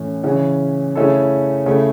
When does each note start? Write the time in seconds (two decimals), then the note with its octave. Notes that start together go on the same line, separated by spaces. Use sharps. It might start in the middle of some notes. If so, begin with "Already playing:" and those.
Already playing: A2 E3 C#4
0.24 C#3 E3 C#4
0.96 C#3 A3 C#4 E4 A4
1.66 C#3 A3 E4